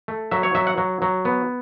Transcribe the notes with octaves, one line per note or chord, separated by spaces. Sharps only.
A3
F#3 E5
C#5
F#3 E5
F#5
F#3
F#3
B3